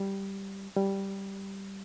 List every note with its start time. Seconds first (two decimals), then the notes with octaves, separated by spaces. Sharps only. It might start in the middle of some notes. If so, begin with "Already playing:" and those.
Already playing: G3
0.76 G3